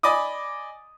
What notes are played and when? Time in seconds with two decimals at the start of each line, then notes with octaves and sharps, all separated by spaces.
0.03 D5 D#5 G#5 B5 D6 D#6